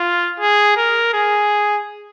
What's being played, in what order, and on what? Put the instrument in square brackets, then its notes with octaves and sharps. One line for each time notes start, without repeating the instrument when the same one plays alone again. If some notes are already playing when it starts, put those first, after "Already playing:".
Already playing: [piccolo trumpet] F4
G#4
A#4
G#4